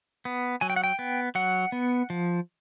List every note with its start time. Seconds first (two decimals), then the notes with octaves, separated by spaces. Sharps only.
0.25 B3
0.61 F#3 G#5
0.70 G5
0.76 F#5
0.84 G5
0.99 B3
1.35 F#3 F#5
1.72 B3
2.10 F3